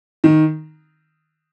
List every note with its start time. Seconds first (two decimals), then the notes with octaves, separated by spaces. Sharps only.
0.24 D#3